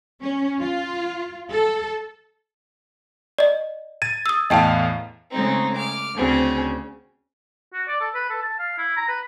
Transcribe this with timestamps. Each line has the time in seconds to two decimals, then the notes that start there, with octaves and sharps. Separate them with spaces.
0.22 C#4
0.60 F4
1.52 A4
3.38 D5 D#5
4.02 G#6 A6 D#7
4.26 D#6 E6
4.50 E2 A2 D#5 F5 G5 A5
5.31 C#3 G#3 A3 C4 D#4
5.77 D6 F6
6.15 D2 C#3 C4 C#4
7.74 F#4
7.88 D5
8.01 A4
8.15 B4
8.29 A4
8.42 A5
8.59 F5
8.78 E4
8.97 A#5
9.08 B4